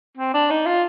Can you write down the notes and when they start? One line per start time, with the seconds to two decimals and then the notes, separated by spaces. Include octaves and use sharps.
0.17 C4
0.34 D4
0.50 D#4
0.66 F4